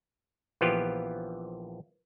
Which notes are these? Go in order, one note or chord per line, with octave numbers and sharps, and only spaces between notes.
A#1 E3 F3 B3 F4 G4